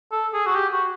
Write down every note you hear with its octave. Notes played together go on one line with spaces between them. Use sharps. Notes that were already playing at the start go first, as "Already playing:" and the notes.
A4
G#4
F#4
G4
F#4